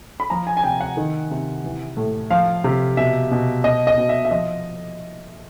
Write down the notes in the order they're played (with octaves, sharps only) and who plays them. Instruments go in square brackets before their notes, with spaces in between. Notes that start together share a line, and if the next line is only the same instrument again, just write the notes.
[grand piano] B5
F3 A#5
G#5
G#5
C3 G5
F#5
D#3
C3
E3
A2
F3 F5
C3
B2 E5
B2
B2 D#5
D#5
B2
E5
E5
F3 D#5